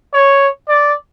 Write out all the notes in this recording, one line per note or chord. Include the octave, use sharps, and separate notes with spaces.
C#5
D5